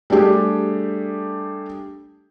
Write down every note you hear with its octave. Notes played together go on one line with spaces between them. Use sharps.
G3 A3 D4 G4 G#4